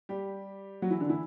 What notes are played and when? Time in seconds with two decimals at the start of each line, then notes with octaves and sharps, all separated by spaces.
0.09 G3 G4
0.82 F#3 F#4
0.90 E3 E4
1.00 D3 D4
1.09 E3 E4